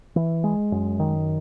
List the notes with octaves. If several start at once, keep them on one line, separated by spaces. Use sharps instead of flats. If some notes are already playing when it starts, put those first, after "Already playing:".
E3
G#3
F#2
D#3